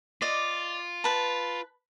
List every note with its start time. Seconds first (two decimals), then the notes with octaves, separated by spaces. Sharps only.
0.22 F4 D5 D#5
1.04 B4 A5